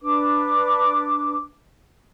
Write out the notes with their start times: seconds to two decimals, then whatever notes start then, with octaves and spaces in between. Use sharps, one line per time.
0.02 D4 B4 D6